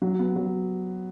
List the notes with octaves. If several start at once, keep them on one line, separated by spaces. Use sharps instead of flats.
F#3
B3
F#3